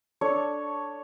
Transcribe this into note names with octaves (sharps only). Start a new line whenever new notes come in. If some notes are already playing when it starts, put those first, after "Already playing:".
D4 A4 C#5 A5